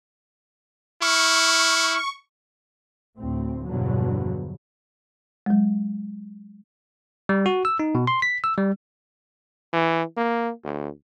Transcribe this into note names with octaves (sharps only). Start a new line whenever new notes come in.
E4 C#6 F6
D2 A2 C4
E2 G2 B2 D3 F3 F#3
F#3 G#3
G3
F#4
E6
D#4
B2
C6
B6
E6
G3
E3
A#3
D2